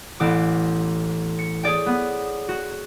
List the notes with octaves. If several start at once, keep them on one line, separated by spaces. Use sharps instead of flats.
A1 B3 D6
C#7
G#4 C#5 D5 G5
B3
F#4